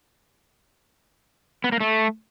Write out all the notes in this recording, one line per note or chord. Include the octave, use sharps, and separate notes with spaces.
B3
A#3
A3